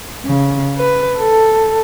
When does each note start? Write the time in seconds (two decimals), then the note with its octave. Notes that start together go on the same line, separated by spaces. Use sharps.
0.25 C#3
0.77 B4
1.18 A4